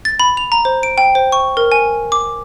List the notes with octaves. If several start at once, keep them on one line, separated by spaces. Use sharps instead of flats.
A6
B5
F7
A#5
C5
D7
G5
C5
C#6
A#4
G#5
D6